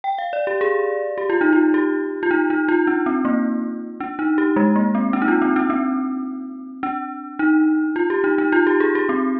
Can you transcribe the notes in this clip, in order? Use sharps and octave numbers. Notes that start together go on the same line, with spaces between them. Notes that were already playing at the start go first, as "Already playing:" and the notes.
G5
F5
D5
G4
G#4
G4
F4
D#4
F4
G4
F4
D#4
D#4
F4
D4
C4
A#3
D4
D#4
G4
G#3
A#3
C4
D4
D#4
F4
C4
D4
C4
D4
D#4
F4
G4
D#4
D#4
F4
G4
G#4
G4
C4